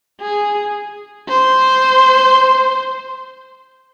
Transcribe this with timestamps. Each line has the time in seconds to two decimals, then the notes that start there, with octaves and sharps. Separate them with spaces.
0.21 G#4
1.29 C5